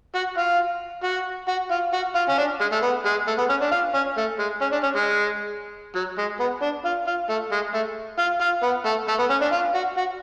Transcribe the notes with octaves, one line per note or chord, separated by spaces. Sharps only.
F#4
F4
F#4
F#4
F4
F#4
F4
C#4
D4
G#3
A3
B3
G#3
A3
B3
C#4
D4
F4
C#4
A3
G#3
C#4
D4
C#4
G#3
F#3
G#3
B3
D4
F4
F4
A3
G#3
A3
F4
F4
B3
A3
A3
B3
C#4
D4
F4
F#4
F#4